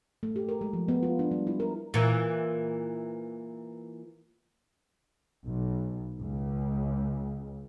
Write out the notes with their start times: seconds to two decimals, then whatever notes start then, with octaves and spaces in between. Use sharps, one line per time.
0.23 A3
0.36 G4
0.49 A#4
0.61 G#3
0.73 F3
0.88 B3
1.03 F4
1.19 D4
1.31 G3
1.47 E4
1.60 A#4
1.94 A#2 E3
5.46 B1
6.20 C#2